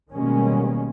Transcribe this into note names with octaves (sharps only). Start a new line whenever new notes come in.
B2 D#3 G3 G#3 A#3 C#4